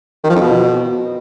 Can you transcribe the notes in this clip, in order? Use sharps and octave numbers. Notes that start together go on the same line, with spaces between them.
D#3
F3
F2
B2